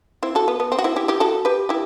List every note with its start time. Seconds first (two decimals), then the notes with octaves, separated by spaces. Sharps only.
0.23 C4 E4
0.35 F#4 A4
0.48 B3
0.60 B3
0.72 C4
0.79 F#4
0.84 C4 E4
0.96 E4 G4
1.08 E4 G4
1.20 F#4 A4
1.45 G4 B4
1.69 E4 G4